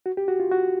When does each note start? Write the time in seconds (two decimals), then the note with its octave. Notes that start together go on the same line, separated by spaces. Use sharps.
0.06 F#4
0.17 G4
0.28 F#4
0.40 F4
0.51 F#4